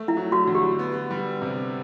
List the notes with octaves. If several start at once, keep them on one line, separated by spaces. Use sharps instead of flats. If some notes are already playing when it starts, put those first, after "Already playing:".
Already playing: A3
E4
F#3
F#4
D3
G4
B3
G3
C3